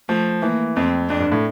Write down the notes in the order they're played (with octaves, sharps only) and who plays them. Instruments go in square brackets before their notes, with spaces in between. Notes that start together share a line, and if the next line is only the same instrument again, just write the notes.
[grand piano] F3 [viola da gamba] A3
[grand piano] E3 [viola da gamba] A#3
[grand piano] F2 [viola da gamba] C4
[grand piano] F2 [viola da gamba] D4
[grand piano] G2
A2